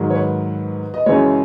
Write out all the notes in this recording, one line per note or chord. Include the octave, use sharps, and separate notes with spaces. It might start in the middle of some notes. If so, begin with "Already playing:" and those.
Already playing: G#2 D#3 F#3
C#5
B4
D#5
F#2 C#3 E3 G#3 C#5